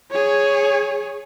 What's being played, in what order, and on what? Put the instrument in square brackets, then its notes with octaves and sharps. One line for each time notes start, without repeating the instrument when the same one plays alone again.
[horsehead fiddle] G#4 C#5